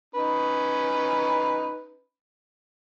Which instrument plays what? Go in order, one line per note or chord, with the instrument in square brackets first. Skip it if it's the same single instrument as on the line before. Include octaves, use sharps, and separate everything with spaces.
[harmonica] C#4 D#4 B4